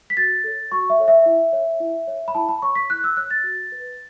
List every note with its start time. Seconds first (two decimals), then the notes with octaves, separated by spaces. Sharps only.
0.10 B6
0.17 F#4 A6
0.44 A4 C#5
0.72 F#4 C#6
0.90 E5
0.99 A4 C#5
1.08 E5
1.26 E4
1.53 C#5
1.80 E4
2.07 C#5
2.28 B5
2.35 E4 A5
2.49 B5
2.62 C#5 C#6
2.75 B6
2.90 E4 F#6
3.04 E6
3.17 C#5 F#6
3.31 A6
3.44 F#4
3.72 B4